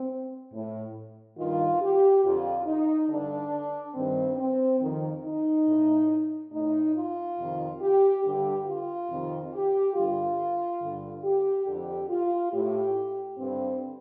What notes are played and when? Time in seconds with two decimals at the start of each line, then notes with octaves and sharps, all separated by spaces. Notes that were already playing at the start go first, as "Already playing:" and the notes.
Already playing: C4
0.53 A2
1.38 G2 D#3 F4
1.82 G4
2.24 F2 D3 F4
2.66 D#4
3.09 G2 D3 D4
3.95 G2 D#3 C4
4.38 C4
4.80 F2 D#3
5.24 D#4
5.67 A2
6.52 A2 D#4
6.95 F4
7.38 F2 C3 D#3
7.80 G4
8.23 G2 D3 G4
8.67 F4
9.09 F2 C3 D#3
9.52 G4
9.94 G2 D3 F4
10.81 G2 D3
11.24 G4
11.66 F2 D3 G4
12.10 F4
12.52 A2 G4
13.38 G2 D3 C4